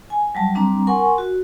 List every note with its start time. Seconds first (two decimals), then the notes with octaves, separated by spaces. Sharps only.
0.10 G#5
0.35 F#3 G3 A5
0.55 G3 C4 D4 A#5
0.87 A#4 F#5 G#5 C6 C#6
1.18 F#4